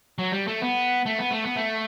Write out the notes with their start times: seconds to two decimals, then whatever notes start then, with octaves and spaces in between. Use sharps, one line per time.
0.18 F#3
0.32 G3
0.48 A3
0.62 B3
1.06 A3
1.18 B3
1.31 A3
1.44 B3
1.56 A3